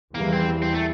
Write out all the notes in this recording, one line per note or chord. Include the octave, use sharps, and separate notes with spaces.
E2 E3 G3 A#3
C4
C4
A3